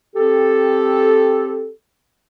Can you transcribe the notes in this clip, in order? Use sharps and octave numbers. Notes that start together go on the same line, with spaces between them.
C4 G4 A4